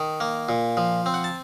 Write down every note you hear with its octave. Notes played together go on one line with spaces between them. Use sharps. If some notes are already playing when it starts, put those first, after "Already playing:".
Already playing: D#3
A#3
A#2
F3
C4
F#5
A5